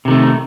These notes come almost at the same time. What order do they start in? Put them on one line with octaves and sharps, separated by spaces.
C3 D#3 A3